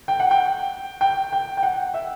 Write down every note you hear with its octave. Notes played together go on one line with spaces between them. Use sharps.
G5
F#5
G5
G5
G5
G5
F#5
E5